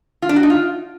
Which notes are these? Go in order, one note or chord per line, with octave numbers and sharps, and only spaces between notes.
F4
D4
F#4
D#4
F4